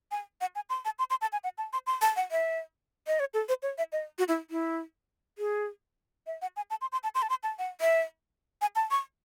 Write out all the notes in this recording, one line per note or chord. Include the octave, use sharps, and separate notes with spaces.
G#5
F#5
G#5
C6
A5
C6
C6
A5
G#5
F#5
A5
C6
C6
A5
F#5
E5
D#5
C#5
A4
C5
C#5
E5
D#5
F#4
E4
E4
G#4
E5
F#5
G#5
A5
C6
C6
A5
C6
A5
C6
A5
F#5
E5
G#5
A5
C#6